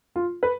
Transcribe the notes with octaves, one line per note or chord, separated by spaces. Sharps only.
F4
B4